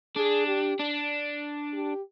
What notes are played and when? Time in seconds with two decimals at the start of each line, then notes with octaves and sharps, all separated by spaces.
0.16 D4 G#4
0.47 G4
0.79 D4
1.73 G4